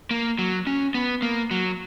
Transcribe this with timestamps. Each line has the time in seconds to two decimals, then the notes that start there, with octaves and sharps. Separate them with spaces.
0.11 A#3
0.39 F#3
0.67 C#4
0.94 B3
1.22 A#3
1.51 F#3